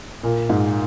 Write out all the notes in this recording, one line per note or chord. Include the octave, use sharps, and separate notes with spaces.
A#2
G#2